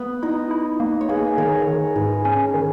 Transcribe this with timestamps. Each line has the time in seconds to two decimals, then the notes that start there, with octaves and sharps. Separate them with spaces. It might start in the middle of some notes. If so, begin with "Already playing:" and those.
Already playing: A#3 B3
0.23 D#4 E4
0.51 E4
0.80 A#3
1.01 C#5
1.09 A#3 G#4 B4
1.38 D#3 A#4 C#5
1.67 D#3
1.96 G#2 G#4 B4
2.25 C#4 A#4 C#5
2.54 D#3